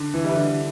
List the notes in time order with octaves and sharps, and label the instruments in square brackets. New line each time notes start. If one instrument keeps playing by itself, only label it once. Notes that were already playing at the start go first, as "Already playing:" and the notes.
Already playing: [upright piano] D3
[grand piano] E3
[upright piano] G3 E4 B4
[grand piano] D3